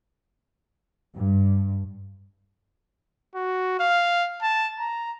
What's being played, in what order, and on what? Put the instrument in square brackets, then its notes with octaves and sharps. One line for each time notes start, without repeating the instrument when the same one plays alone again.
[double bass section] G2
[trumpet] F#4
F5
A5
A#5